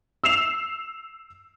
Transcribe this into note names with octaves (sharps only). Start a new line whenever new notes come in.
E6 C7 E7 F7